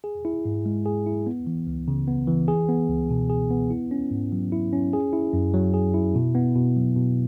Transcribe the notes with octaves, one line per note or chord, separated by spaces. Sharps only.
G#4
E4
G#2
G#3
G#4
E4
B3
E3
C#2
C#3
B3
E3
G#4
B3
C#2
B2
G#4
B3
E4
C#4
G#2
F#3
E4
C#4
G#4
E4
F#2
F#3
G#4
E4
B2
B3
B2
F#3
B2